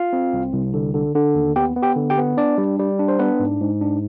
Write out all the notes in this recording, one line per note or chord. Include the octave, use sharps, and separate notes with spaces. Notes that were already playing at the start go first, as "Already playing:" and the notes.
Already playing: F4 F5
C4
C2
C2
D3
D3
D3
D#2
B3 G4 G5
B3
G4 G5
D3
G4 G5
B3
D4 D5
G3
G3
D4
C5
B3 D4 B4
G#2
G#2
D4